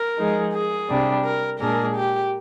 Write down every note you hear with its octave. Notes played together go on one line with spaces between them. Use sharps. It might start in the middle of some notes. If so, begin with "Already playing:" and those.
Already playing: A#4
F3 G#3 D#4 G#4
G#4
C3 G3 D4
A#4
A#2 G#3 D4 G#4 A#4
G4